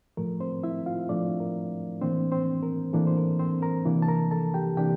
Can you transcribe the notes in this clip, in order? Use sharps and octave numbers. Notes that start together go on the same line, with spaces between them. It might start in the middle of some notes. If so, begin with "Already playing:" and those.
A2 F3 A3 A#4
C4 C5
E4 E5
F4 F5
A2 F3 A3 D4 D5
A#4
A2 E3 A#3 C4 D4 C5
C4 C5
A#4
A2 E3 A#3 D4 A4
C5
A#4
C4 C5
A#4 A#5
C3 E3 A#3 D4
A5
A#4 A#5
A4 A5
G4 G5
C3 E3 A#3 D4 G4 G5